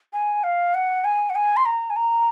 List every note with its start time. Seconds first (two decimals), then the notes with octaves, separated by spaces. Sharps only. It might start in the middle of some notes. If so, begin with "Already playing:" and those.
0.13 G#5
0.44 F5
0.74 F#5
1.04 G#5
1.30 F#5
1.35 G#5
1.57 C6
1.65 A#5
1.90 G#5
1.96 A#5